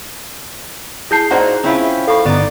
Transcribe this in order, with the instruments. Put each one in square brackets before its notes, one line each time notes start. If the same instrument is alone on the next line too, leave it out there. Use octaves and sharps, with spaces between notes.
[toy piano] E4 A5 [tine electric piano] G#4 G6 C7
[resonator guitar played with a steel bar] A#2 F#4 C5 [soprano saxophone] D#4 [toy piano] D5 F#5
[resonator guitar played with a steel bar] C4 E4 F4 [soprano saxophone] C#4
[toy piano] A4 B5 C#6 [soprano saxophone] F5
[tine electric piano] G1 [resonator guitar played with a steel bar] B3 D#4 [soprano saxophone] D5